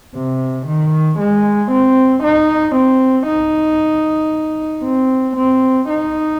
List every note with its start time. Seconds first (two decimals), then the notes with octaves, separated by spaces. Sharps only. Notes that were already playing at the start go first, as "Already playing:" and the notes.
0.15 C3
0.67 D#3
1.20 G#3
1.72 C4
2.24 D#4
2.76 C4
3.27 D#4
4.84 C4
5.37 C4
5.89 D#4